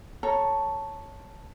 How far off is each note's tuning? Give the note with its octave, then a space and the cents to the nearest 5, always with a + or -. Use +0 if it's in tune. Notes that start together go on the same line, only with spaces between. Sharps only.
A4 +0 C#5 +0 A#5 +0